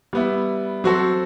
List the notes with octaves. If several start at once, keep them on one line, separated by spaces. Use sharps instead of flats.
G3 B3 E4
F#3 C4 F#4 A4 C5